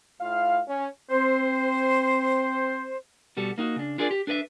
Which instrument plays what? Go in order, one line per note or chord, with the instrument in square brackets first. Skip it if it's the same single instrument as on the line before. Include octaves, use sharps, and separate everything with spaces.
[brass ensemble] A2 F4 F5
C#4
[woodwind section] C4 C5
[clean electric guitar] B2 G3 F#4 A4
A#3 D#4 F#4
C#3 D4
D4 F4 G#4 A#4 D5
G4
D4 A4 B4 D5 E5